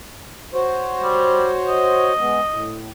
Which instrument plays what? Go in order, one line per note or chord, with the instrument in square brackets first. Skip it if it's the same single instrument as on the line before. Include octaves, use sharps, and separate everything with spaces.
[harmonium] F#4 C5 C#5
[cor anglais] G3
D#5
[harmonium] G#3 B3
A2